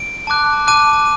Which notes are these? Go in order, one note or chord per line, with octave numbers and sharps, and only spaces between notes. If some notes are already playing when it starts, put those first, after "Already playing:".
Already playing: D7
A5 D6 F#6
A5 D6 F#6 D#7